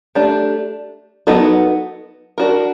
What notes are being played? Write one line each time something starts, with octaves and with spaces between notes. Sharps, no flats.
A3 D4 G4
F#3 B3 D#4 F#4 A4
D4 F#4 A#4